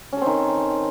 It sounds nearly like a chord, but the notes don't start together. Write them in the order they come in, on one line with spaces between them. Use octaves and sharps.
C#4 A4 C4 D#3